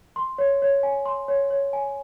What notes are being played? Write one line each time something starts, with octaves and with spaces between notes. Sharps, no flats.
C6
C#5
C#5
G#5
C6
C#5
C#5
G#5